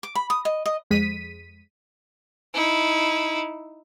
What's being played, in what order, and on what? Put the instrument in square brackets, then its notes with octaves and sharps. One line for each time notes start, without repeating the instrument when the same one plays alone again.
[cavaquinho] D6
B5
D#6
D#5
D#5
[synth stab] F2 G#3 B6 D#7
[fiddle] D#4 E4